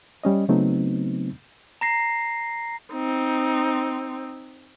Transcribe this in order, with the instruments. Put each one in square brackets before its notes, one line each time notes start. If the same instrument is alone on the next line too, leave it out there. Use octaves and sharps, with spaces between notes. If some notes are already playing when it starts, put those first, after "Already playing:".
[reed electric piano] G3 C#4 D#5
C#3 F#3 A3 B3 C4 D#4
[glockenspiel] A#5 A#6 C7
[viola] C4 D#4